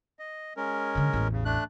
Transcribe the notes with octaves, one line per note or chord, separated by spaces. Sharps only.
D#5
G#3 C#4 A#4
D3 D#3
A1 E2
C#3
A3 D4 F#6